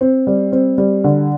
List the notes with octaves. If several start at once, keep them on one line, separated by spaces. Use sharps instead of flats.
C4
G3
C4
G3
D3